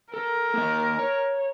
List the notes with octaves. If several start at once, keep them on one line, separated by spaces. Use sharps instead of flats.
A4 A#4
A#3 D#4 D#5
C#5